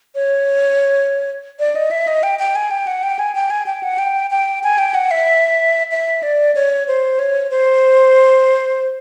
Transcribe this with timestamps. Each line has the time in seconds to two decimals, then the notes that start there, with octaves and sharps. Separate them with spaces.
0.15 C#5
1.59 D5
1.75 D#5
1.91 E5
2.07 D#5
2.23 G5
2.39 G5
2.55 G#5
2.71 G5
2.87 F#5
3.03 G5
3.19 G#5
3.35 G5
3.50 G#5
3.66 G5
3.83 F#5
3.98 G5
4.31 G5
4.63 G#5
4.78 G5
4.94 F#5
5.11 E5
5.91 E5
6.23 D5
6.55 C#5
6.88 C5
7.19 C#5
7.51 C5